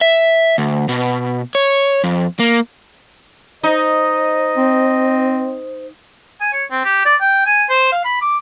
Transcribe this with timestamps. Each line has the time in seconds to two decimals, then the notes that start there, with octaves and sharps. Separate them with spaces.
0.01 E5
0.58 D2
0.89 B2
1.55 C#5
2.04 F2
2.39 A#3
3.63 D#4 C5 D#5
4.57 C4
6.41 G#5
6.52 C#5
6.71 C4
6.85 G4
7.05 D5
7.21 G5
7.46 G#5
7.70 C5
7.92 F5
8.05 B5
8.21 D6